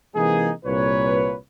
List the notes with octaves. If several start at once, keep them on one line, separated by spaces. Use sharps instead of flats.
C3 E3 G#3 A#3 D#4 G#4
C2 A#2 B4 C#5